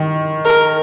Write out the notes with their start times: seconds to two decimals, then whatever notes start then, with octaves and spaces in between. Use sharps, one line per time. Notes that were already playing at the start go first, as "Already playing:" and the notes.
Already playing: D#3
0.45 A#4